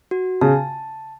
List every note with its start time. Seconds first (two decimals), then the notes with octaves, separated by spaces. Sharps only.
0.11 F#4
0.41 C#3 A5